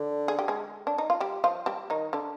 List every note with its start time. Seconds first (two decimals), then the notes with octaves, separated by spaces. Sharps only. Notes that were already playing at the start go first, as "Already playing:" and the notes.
Already playing: D3
0.28 G#4
0.39 G4
0.48 G#3 G#4
0.87 D4
0.98 D#4
1.10 F4
1.20 G3 G4
1.44 F3 F4
1.66 G3 G4
1.90 D#3 D#4
2.13 D3 D4